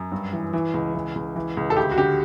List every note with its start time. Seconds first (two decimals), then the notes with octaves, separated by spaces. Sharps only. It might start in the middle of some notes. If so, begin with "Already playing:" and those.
Already playing: F#2
0.12 G2
0.33 E3
0.53 E3
0.74 C#2
0.95 E3
1.15 C#2
1.36 E3
1.57 C#2
1.70 A4
1.77 D2 G4
1.91 F#4
1.97 D3 G4